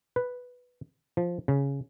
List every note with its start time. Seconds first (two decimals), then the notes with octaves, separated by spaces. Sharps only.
0.16 B4
1.17 F3
1.48 C#3